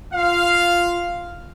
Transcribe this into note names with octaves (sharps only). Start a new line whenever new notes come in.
F4 F5